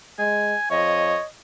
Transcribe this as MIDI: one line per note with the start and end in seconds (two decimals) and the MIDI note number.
0.19 0.54 56
0.19 0.67 80
0.71 1.17 41
0.71 1.22 73
0.71 1.27 75